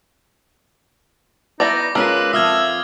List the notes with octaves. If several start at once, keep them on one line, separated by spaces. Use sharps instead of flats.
B3 D#4 E4 D5 D6 A#6
G#3 C#4 F4 A#4 B4 E6
F2 F4 E5 D#6 F6 G#6